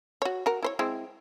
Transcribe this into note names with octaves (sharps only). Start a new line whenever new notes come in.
F#4 C#5
F#4 A#4
E4 C5 C#5
G#3 C4 E4